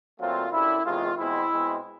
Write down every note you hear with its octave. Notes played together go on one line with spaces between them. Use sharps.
A#2 F#3 A3 C4 F4
F#2 D3 G3 E4
E2 C3 D#3 G#3 F4
E2 B2 G#3 C4 E4
B2 G#3 C4